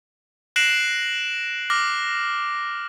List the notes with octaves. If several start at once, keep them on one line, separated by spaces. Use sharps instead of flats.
F#6 A#6 C7 D7 E7 F#7
D6 F6 A#6